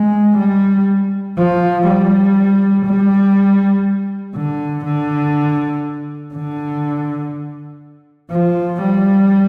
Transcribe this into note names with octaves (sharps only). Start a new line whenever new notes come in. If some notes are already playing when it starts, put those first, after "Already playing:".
Already playing: G#3
G3
F3
G3
G3
D3
D3
D3
F3
G3